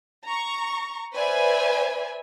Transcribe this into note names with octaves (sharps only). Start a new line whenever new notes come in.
A#5 C#6
B4 C5 D5 E5 G#5